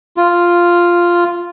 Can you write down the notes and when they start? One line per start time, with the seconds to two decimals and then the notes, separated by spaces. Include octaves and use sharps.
0.17 F4